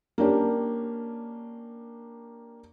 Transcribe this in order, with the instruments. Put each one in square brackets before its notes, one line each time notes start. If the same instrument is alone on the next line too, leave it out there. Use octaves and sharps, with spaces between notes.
[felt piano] A#3 C#4 D4 G4